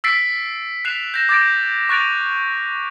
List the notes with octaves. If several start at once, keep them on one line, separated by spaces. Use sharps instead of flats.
E6 A6 B6 C7 D7
F#6 B6 C7 E7 F7
G6 A#6 E7
D6 G6 A6 A#6 D7
C#6 F#6 A6 D7 F7